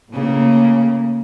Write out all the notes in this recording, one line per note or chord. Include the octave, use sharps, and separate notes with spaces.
A2 C#3 A#3